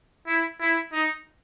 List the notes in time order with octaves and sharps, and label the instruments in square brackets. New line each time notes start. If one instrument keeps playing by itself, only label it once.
[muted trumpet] E4
E4
D#4